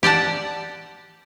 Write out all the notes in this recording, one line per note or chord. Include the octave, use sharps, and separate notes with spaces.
G4 D5 F#5 A5